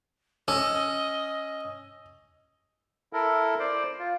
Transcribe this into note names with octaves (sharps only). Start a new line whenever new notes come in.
C#4 D#5 E6
E4 A4 A#4
C5 D5
F4